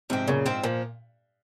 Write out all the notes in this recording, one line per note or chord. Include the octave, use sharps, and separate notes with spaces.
G#2 C3 F3 C4
F#2 A#2 C#3
G#2 F3 C4
A#2 F3